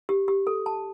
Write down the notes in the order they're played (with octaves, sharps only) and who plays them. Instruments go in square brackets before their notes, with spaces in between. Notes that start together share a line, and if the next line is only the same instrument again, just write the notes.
[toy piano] G4
G4
A4
A5